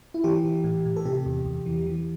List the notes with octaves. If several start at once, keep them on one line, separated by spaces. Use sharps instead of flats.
E4
E3 G4
E3
A2
A2
A4
C3 G4
E2
E2
E3
E3